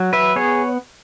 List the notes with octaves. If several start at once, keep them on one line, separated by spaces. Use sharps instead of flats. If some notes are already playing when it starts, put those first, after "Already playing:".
Already playing: F#3
B4 E5
B3 G#4 C#5